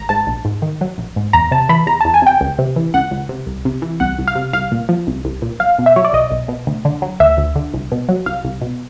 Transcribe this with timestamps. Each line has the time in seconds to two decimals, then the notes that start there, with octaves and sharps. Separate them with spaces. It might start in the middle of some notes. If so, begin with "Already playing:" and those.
Already playing: G#1 A#5
0.09 G#2 A5
0.27 A#1
0.45 G#2
0.62 D#3
0.81 F#3
0.98 A#1
1.16 G#2
1.33 E2 A#5
1.51 C3 A5
1.69 E3 B5
1.86 E2 A#5
2.01 E2 A5
2.14 G#5
2.22 C3 G5
2.41 C#2
2.59 C3
2.76 E3
2.94 C#2 F#5
3.11 C#2
3.29 C3
3.47 C2
3.65 C3
3.82 E3
4.00 C2 F#5
4.19 C2
4.28 F5
4.35 C3
4.53 C2 F5
4.72 A#2
4.89 F3
5.07 C2
5.25 C2
5.42 A#2
5.60 B1 F5
5.79 B2
5.86 E5
5.96 F#3 C#5
6.05 D5
6.13 B1 D#5
6.31 B1
6.48 B2
6.67 D2
6.85 D3
7.02 F#3
7.20 D2 E5
7.37 D2
7.56 D3
7.74 C2
7.92 B2
8.09 F#3
8.26 C2 F5
8.44 C2
8.62 B2